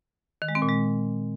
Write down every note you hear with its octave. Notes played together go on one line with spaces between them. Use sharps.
D#3
G#3
C4
A#2
G#3